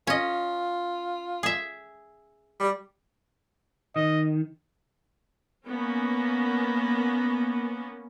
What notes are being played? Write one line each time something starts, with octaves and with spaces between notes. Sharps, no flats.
C#4 F4 D#5
G#4 E5
G3
D#3 D#5
A#3 B3 C#4